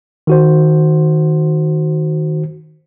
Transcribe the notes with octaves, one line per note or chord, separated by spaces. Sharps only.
D#3 F#4 C5